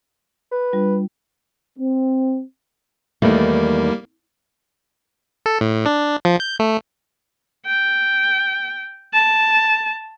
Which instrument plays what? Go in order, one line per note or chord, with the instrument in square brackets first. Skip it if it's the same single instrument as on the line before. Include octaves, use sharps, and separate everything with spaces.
[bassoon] B4
[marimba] G3 D4 F4
[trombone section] C4
[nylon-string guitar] E2 D#3 A3 [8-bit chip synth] G3 A#3
[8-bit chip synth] A4
A2
D4
F3
G6
A3
[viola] G5
A5